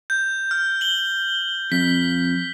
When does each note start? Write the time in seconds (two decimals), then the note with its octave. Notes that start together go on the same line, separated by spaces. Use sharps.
0.10 G6
0.51 F6
0.81 F#7 G7
1.72 F2 B6